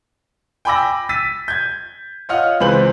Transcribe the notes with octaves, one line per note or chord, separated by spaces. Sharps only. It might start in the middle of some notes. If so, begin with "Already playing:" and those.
G5 G#5 B5 D6 E6 A#6
E6 A6 B6 D#7
G6 G#6
F4 C#5 D#5 F#5 F6
C#2 E3 C4 B4 C5 F#7